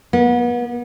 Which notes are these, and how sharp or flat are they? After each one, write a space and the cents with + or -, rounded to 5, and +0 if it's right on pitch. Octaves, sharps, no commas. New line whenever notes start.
B3 -35